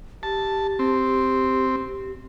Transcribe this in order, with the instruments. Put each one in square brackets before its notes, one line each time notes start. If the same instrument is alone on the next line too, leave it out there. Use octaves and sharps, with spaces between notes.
[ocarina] G4 [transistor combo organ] A5
[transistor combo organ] C4